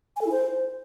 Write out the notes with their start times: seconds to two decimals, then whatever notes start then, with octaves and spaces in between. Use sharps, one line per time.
0.16 G#5
0.21 A4
0.26 E4
0.32 C5